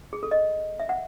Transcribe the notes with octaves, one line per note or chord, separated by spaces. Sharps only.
G#4
A4
D#5
E5
F#5